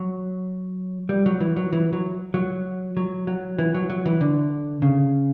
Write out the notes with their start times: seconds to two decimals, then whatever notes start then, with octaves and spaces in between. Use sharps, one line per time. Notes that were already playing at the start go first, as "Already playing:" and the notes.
Already playing: F#3
1.09 G3
1.26 F#3
1.40 E3
1.56 F#3
1.73 E3
1.93 F#3
2.34 F#3
2.97 F#3
3.27 F#3
3.58 E3
3.74 F#3
3.90 F#3
4.06 E3
4.21 D3
4.82 C#3